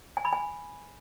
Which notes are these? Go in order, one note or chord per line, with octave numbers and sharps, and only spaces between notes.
G#5
B5
G#5